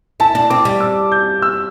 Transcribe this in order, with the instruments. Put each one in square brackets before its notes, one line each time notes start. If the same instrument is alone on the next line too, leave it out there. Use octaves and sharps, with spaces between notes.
[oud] E4 [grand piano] A5
[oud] D4
[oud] C4 [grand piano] D6
[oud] G3
[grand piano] E6
G6
E6